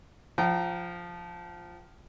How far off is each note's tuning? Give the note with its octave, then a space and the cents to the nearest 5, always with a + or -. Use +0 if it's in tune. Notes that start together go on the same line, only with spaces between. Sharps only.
F3 +0 G5 -35 A#5 +0